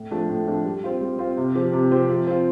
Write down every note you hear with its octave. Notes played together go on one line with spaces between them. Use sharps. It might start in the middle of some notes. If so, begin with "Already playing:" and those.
Already playing: A2
F3 A3 D4
A2
F3 A3 D4
G3
C4 F4
G3
C4 F4
C3
F3 C4 G4
C3
F3 C4 G4
F3
C4 F4